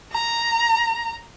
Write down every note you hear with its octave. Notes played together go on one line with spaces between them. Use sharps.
A#5